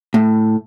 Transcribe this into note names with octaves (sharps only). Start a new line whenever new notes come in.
A2